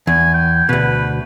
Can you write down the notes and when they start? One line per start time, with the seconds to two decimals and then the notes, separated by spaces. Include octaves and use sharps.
0.07 E2 G#5
0.34 G5
0.69 D2 B2 B4